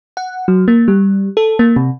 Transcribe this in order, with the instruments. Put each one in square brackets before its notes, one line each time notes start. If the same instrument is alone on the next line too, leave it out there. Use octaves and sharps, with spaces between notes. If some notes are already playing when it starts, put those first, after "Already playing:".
[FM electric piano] F#5
F#3
A#3
G3
A4
A#3
C3